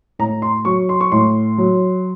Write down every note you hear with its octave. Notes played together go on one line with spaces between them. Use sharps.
A2 A#5
C6
F#3 C#6
C6
C#6
A2 C6
F#3